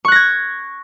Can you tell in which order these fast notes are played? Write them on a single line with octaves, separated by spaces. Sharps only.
C#6 F#6 A#6 G#6